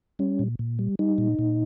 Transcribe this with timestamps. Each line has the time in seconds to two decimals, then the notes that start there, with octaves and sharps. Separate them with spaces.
0.19 G3 C#4
0.39 A#2
0.59 A#2
0.79 G3
0.99 G3 D#4
1.18 A#2
1.39 A#2